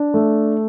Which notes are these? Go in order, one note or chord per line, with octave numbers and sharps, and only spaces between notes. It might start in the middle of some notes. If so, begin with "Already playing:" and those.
Already playing: D4
A3